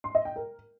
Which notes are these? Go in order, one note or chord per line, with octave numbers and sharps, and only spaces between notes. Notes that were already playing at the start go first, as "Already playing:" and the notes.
C6
D#5
G5
A#4